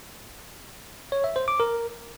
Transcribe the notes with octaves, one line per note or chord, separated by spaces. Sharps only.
C#5
E5
C5
D6
A#4